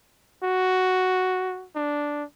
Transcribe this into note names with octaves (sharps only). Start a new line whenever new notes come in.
F#4
D4